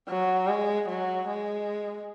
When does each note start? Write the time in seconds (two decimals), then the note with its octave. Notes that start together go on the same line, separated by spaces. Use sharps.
0.09 F#3
0.48 G#3
0.89 F#3
1.28 G#3